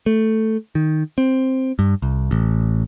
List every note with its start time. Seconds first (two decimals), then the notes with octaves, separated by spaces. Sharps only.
0.06 A3
0.75 D#3
1.18 C4
1.79 G2
2.02 C2
2.31 A1